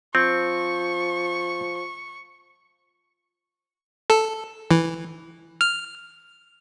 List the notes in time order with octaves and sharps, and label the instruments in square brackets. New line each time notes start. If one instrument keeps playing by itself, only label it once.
[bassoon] F3 [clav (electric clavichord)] C4 [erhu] C#6
[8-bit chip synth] A4
E3
F6